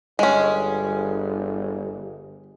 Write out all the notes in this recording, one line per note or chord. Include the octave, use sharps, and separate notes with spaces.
G1 G#3 C#4